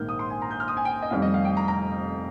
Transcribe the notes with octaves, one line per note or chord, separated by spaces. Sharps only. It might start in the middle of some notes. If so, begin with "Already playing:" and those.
Already playing: A#1 G#2 D#3 A#3 F6 G6
D#6
C6
G#5
A#5
G6
F6
D#6
G#5
G5
D#5
F1 F2 D#3 G3 F5
D#5
F5
G5
A#5
A#5